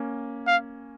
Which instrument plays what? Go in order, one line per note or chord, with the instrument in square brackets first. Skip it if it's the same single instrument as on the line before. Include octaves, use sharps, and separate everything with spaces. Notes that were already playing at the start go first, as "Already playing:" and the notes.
Already playing: [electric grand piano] A#3 C#4
[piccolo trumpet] F5